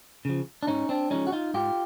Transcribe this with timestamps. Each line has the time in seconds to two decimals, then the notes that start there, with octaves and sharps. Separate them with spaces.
0.25 C#3 F3
0.63 D4
0.67 G#2 C#4 D#4
0.89 C4 D4
1.10 F3 G#3 C#4 D#4
1.27 F#4
1.32 D#4 F4
1.54 G#2 F4 G4